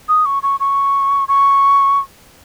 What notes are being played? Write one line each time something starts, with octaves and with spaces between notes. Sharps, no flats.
D#6
C#6
C#6
C#6
C#6